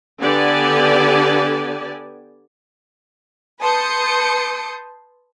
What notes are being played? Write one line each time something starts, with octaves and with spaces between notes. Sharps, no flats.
D3 B3 G4 D5 G#5 A5
B4 A5 C6 D#6 G6 C#7